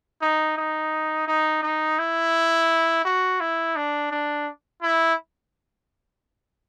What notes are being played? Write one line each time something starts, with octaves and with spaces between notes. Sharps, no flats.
D#4
D#4
D#4
D#4
E4
F#4
E4
D4
D4
E4